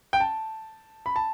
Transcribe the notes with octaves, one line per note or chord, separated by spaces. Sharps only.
G5
A5
B5
A5